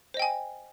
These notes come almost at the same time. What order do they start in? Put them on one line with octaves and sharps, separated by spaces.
C5 D#5 G5 G#5